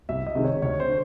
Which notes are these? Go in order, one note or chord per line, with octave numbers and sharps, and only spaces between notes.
C2 E5
D#5
C3 D#3 G#3 C4
C#5
D2 C#5
C5
D3